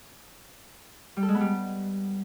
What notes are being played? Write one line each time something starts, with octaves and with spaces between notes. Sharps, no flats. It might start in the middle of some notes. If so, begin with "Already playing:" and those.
G3
A4
G#3
B3
G3